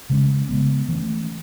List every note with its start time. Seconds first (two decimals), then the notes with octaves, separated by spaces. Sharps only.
0.10 C#3 G#3 C#4
0.49 C#3 G#3 B3
0.89 E3 A3 C#4